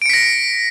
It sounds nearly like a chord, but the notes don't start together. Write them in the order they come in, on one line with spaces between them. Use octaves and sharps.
D7 C#7 B6 A#6